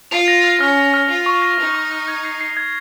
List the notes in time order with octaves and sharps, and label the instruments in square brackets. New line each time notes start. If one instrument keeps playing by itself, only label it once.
[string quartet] F4 [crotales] F7
[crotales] A#6
F6
[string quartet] C#4 [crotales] F6
[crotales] A#6
F6
[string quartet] F4 [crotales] F7
[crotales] C#6
A#6
[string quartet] D#4 [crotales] F7
[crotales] C#6
F6
G#6
C7
C7
G#6